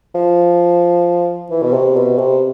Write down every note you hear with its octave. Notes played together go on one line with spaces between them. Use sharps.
F3
E3
B2
C3
B2
C3